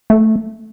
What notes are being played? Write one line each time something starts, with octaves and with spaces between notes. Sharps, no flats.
A3